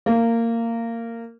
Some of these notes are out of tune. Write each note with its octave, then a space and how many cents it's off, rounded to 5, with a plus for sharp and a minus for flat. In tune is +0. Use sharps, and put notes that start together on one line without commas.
A#3 -20